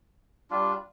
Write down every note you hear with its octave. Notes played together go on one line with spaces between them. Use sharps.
G3 D4 F4